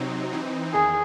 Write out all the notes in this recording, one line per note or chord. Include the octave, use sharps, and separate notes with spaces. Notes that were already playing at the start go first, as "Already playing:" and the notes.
Already playing: C3 F#3 C4 D#4
E3 C4 D#4
E2 D#3 G#4